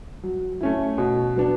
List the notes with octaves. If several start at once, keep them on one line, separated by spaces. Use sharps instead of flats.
F#3
A3 C#4 E4
B2
F#3 B3 D4